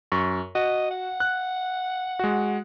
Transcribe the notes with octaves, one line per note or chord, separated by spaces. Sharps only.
F#2 C#6
F#4 D#5
F#5
F#6
G#3 F#4